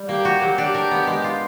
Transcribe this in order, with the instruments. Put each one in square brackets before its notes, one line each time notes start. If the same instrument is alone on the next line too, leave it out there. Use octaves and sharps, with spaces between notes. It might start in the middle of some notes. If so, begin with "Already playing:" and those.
Already playing: [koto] G3
[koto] A#3 [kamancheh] G4
[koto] F#4
F#3
[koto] D4 [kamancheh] G4
[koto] A#4
B3
G#3
F4